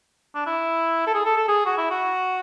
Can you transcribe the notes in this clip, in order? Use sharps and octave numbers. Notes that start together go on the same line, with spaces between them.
D4
E4
A4
G#4
A4
A4
G#4
F#4
E4
F#4